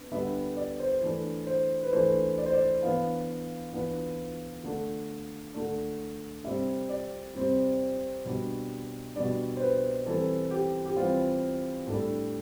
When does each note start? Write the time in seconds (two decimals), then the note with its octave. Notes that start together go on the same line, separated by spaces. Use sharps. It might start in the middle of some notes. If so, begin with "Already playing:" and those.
Already playing: B3 D4
0.11 D3 G3 B3 D4 E5
0.57 D5
0.80 C5
1.02 E3 A3 D4
1.47 C5
1.83 B4
1.92 E3 A3 D4 C5
2.38 D5
2.46 C5
2.53 D5
2.83 E3 B3 D4 F5
3.73 E3 B3 D4
4.64 D3 A3 D4
5.54 D3 A3 D4
6.44 C3 G3 C4 E5
6.89 D5
7.35 C3 G3 C4
8.25 B2 G3 D4
9.15 B2 G3 D4 D5
9.57 C5
9.61 B4
10.06 E3 G3 C4 A4
10.51 G4
10.85 G4
10.96 E3 G3 C4 F4
11.87 A2 G3 D4 A4